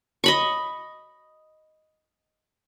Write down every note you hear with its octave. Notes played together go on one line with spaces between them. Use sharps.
D#5 B5 C#6